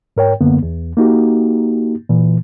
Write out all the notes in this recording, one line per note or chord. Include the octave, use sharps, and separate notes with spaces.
G#2 A#4 C#5 G5
F#2 D3 A#3 B3
E2
A#3 D#4 F#4 G4
A#2 E3